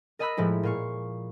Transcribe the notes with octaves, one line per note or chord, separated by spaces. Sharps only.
A#4 D#5 A5 B5 E6 F#6
A2 F3 G#3 E4
A#2 F5 C#6